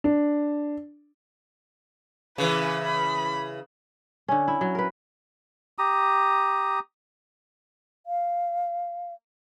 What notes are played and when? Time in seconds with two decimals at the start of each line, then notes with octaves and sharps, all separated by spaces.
0.04 D4
2.38 C#3 E3 B4
2.84 B5
4.28 D3 C#4
4.48 E4
4.61 F#3
4.75 A#4 B4
5.78 G4 A#5 D#6
8.06 F5